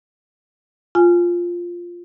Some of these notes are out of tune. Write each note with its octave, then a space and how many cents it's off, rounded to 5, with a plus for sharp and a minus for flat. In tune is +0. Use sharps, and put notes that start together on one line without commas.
F4 +0 G#5 +0